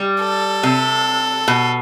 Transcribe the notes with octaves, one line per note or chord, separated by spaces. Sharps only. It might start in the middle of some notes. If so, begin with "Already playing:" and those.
Already playing: G3
A4
C3
B2